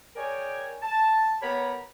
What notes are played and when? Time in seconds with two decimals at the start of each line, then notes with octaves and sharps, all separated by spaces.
0.16 G#4 A#4 C#5 D5 G5 G#5
0.83 A5
1.42 B3 G4 A#4 C#5 A#5 B5